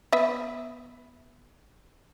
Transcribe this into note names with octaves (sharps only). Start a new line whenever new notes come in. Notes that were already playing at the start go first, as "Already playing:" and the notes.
B3 E5